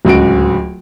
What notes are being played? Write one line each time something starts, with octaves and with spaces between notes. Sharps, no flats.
D1 C#2 F#4 D7